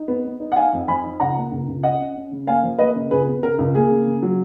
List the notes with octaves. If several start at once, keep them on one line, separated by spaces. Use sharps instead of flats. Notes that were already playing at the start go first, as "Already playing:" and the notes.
Already playing: D#4
B3
B3
D#4
F#5
D#4 F5 G#5
F2
F3 G#5 B5
D#4
C#2 F#5 A#5
A#3
C#2
C#2
C#4 D#5 F#5
C#4
C#4
C#3
A#3 F5 G#5
F3
A#3 B4 D#5
C#3
C#2 G#4 B4
B3
C#3 A#4
C#2
A#3 G#4
C#3
C#3
F#3